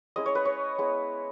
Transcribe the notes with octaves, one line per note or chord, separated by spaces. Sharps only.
G#3 C#4 E4 D#5
C#5
B4
C#5
G#3 B3 E4